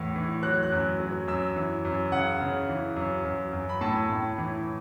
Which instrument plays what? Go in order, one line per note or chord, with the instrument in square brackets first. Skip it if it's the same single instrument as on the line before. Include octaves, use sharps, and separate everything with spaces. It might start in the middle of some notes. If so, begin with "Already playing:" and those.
Already playing: [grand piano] E2 A2 E3
E3
F#3 F#6
F#6
F#2
F#3
F#2 E6
E3
F#2
C#3 F#5
C#3
E3
F#2
F#2
F#2
B5
A2 A5
A2
E3